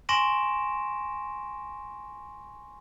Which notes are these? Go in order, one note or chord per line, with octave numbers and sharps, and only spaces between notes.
G#5 C6 C#6 A#6 D7 E7